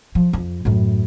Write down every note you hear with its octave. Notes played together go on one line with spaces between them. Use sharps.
F3
F2
F#2 A2